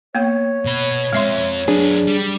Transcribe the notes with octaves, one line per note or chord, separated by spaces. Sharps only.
A#3 B3 C#5 G5
B2 B5
F2 G#3 E5 C6
F#2 D4 G#4 B4
G3